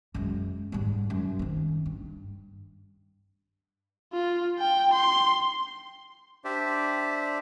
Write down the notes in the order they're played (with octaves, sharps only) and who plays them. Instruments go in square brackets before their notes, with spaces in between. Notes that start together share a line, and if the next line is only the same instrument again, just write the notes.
[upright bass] F#2 G#3
G#2 G3
F#2
D#3 C4
G2
[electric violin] F4
G5
C6
[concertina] D4 G4 C5 D5 E5